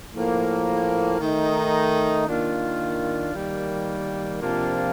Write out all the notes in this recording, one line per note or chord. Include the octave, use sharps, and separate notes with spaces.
A2 F3 A#3
D#3 A3 D#4
D#3 A#3 D4 F4
D#3 G3 A#3
C3 F3 A#3 D4 F4